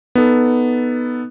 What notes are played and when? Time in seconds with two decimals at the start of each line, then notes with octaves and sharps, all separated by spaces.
0.15 B3 D#4 A4